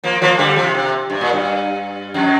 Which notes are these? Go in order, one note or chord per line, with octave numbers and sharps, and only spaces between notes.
F3 A#3
F3 A#3
D3 G3
C3 F3
C3
G2
A#2
G2
F2